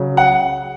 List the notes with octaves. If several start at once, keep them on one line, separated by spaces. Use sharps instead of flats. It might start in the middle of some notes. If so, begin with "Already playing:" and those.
Already playing: C#3 F#3
F#5